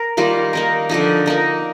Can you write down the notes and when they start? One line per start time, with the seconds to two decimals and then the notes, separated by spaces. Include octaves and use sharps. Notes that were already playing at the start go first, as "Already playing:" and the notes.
Already playing: A#4
0.17 D#3 G3 A#3 F4
0.53 A#3 D#4 A#4
0.89 D3 F3 A#3 D#4
1.26 A#3 D#4 A#4